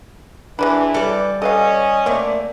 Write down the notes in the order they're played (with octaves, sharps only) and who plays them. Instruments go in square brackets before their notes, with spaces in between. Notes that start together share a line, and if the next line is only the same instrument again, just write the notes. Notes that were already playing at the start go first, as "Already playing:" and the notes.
[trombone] E3 [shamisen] G#3 B4 B5 [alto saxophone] D4
[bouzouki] G3 D5 [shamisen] A4 [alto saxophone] B4
[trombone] C#4 [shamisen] A4 B4 F5 [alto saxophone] D#5
[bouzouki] A3 D5 E5 [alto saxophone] A#3 [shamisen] C4